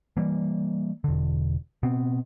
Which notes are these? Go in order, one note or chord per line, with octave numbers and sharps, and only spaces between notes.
E3 G3 A#3
E1 D3
B2 B3 C4